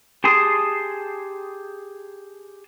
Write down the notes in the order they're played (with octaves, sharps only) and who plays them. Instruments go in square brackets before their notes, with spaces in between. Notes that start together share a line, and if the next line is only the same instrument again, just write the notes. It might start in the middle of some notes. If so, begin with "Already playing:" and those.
[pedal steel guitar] G4 G#4 A5 C6 D#6